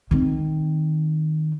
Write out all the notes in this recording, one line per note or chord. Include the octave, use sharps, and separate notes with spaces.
D#3 C4